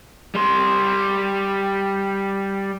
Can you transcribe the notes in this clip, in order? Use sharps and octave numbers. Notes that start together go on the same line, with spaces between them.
G3 C6